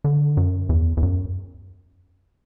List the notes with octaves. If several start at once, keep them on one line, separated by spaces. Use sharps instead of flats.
D3
F#2
E2
E2
F#2